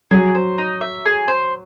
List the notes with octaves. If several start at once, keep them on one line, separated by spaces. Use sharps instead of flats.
F#3 G#4
C5
D#4
E5
G#4
C5